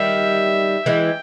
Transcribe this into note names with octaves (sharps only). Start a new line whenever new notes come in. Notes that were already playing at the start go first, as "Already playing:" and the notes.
Already playing: D#3 G3 E5
E3 G#3 G5